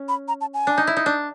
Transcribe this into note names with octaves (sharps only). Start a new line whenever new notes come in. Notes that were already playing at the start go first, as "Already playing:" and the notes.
Already playing: C#4
B5
A#5
A5
G#5
D4
D#4
E4
D#4
D4